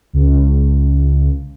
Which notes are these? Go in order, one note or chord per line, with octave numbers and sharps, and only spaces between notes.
C#2